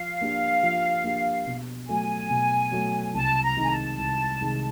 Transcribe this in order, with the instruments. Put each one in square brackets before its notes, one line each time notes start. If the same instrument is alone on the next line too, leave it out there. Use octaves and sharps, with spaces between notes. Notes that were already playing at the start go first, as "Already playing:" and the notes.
Already playing: [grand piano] F3 [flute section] F5
[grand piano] A#3 D4 G4
F3
A#3 D4 G4
B2
[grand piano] F#3 A3 [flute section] G#5
[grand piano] B2
F#3 A3
[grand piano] C2 [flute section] A5
[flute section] A#5
[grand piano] C3 D#3 G#3
[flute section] G#5
A5
[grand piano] C2
C3 D#3 G#3